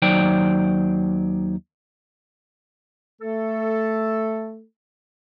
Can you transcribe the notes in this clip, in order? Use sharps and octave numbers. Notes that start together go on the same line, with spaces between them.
D#2 F#3 D#4 C5 D5 G5
A3 A4